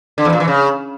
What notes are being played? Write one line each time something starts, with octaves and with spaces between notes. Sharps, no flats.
D3
E2
A#2
E3
C#3